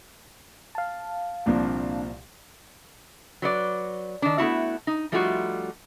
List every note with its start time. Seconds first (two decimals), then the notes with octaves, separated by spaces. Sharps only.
0.75 F5 A5
1.46 C2 A#2 F3 A#3 C4 D4
3.42 F#3 B4 D5
4.22 D#3 D4
4.38 A3 B3 E4 F#4
4.87 D#4
5.12 F3 G3 A3 D#4 F4 F#4